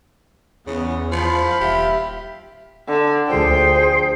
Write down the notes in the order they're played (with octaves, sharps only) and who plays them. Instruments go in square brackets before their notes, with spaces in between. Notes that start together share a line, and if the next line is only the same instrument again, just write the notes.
[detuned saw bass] E2 [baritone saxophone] C#3 [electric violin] B3
[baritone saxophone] F3 [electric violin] F5 B5
[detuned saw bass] D#1 [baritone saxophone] G4 [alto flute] E5
[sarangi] D3
[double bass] D2 F3 [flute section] G#4 C5 [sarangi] G5